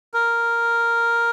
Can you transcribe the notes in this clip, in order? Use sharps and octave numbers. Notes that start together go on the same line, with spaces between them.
A#4